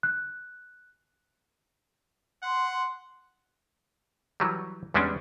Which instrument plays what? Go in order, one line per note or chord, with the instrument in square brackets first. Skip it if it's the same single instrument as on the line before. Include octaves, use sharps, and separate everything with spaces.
[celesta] F#6
[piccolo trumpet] F#5 [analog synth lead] C6
[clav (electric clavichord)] E3 F#3 G3
E2 G3 G#3 C#4 D4